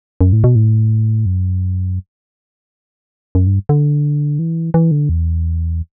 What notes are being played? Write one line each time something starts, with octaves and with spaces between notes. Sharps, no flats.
F#2
A2
B2
A2
F#2
F#2
G2
D3
E3
E3
D3
E2